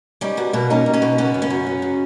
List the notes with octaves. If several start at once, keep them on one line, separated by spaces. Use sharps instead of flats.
G3 C#4 D#4
B2 B3
B2 A#3
A#3 C#4 D#4
G3
C#4 D#4
B2
C#3 B3 C#4
F#2
B3 C#4
F#2
F#3
C#3